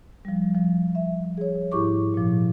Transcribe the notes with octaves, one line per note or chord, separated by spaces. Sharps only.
F3 G3
F3
E5
G#4 C#5
G#2 E4 G4 C#6 D6
A#2 F3